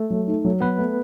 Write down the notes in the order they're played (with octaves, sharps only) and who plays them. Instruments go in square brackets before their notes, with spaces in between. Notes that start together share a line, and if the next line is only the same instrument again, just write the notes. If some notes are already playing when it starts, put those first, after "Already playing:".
Already playing: [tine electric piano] A3 A4
[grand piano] F#3
D#4
F#3
[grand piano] F#3 [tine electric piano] B3 B4
[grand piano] A3